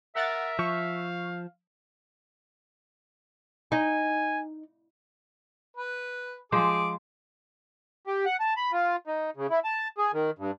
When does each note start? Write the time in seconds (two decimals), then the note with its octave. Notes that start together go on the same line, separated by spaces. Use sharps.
0.16 A#4 E5 F#5 A6
0.59 F3 F5 C#6
3.72 D#4 G#5
5.77 B4
6.52 F3 G#3 G#4 C5 D6
8.07 G4
8.26 F#5
8.40 A5
8.57 B5
8.73 F4
9.07 D#4
9.37 C#3
9.50 E4
9.64 A5
9.98 G#4
10.13 D#3
10.38 G2